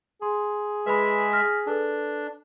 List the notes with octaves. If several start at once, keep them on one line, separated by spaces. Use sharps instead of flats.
G#4 C6
G#3 B4 E5 B5
F6 A#6 B6
D4 A4 B4